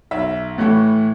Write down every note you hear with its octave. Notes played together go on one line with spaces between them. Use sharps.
B1 E5
A2 E3 A3